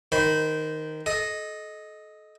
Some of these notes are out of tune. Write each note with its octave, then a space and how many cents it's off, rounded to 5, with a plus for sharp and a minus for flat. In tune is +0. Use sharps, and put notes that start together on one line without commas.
D#3 +0 C5 -20 B5 +0
A4 -30 D#5 +0